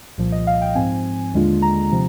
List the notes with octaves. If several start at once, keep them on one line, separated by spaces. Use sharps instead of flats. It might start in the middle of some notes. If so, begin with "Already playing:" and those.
C2 A#2 F3
D#5
F5
G5
G#2 F3 C4 G#5
D#2 D3 G#3 D4 F4
A#5
C3 F3 C4